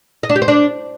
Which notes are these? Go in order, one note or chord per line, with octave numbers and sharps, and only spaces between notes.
D#5
D4
G4
C5
D4